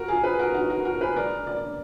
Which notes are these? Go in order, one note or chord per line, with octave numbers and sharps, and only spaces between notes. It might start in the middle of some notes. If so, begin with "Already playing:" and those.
Already playing: F#4 A#4
F4 G#4
G#4 B4
F#4 A#4
D#4 F#4
F#4 A#4
F#4 A#4
G#4 B4
A#4 D5
A#4 D5